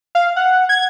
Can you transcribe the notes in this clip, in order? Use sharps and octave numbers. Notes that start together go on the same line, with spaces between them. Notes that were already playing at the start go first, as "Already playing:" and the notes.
F5
F#5
G#6